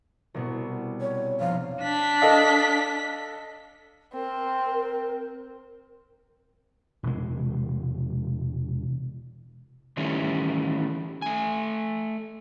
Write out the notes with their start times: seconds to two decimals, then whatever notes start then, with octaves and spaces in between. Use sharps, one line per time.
0.34 C2 B2 B3
1.01 C#5
1.40 F1 F5
1.81 D4 B6
2.22 A4 D#5 F5
4.14 C4 A#4
7.03 E1 C3 G#3
9.97 D#3 E3 G3 A3 C#4
11.22 A3 G#5